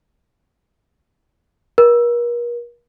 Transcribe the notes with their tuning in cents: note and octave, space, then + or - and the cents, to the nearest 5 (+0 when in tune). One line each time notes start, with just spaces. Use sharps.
A#4 +40